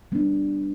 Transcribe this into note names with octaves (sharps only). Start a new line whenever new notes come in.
G3 B3 D4